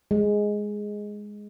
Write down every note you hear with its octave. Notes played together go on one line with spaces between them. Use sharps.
G#3